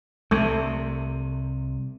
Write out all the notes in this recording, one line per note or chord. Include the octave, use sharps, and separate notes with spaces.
C2 C3 A3